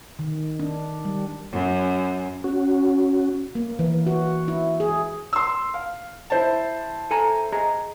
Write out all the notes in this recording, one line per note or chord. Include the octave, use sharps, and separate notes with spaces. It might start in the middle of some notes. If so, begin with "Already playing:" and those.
D#3
D4
G3
F#2
C#4 F#4
A#3
E3
F#4
E4
G#4
C6 E6
F5
E4 C5 A5
A4 G#5 A#5
G#4 D#5 A#5